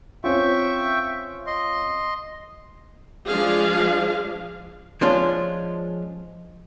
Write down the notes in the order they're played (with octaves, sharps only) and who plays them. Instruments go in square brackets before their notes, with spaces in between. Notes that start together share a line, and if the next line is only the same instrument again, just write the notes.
[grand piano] C4 C#4 F4 [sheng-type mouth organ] E5 G5 C#6
[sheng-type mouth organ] D#5 C6
[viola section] F3 G#3 D4 G#4 F5
[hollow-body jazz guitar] F3 G#3 C#4 D4 F4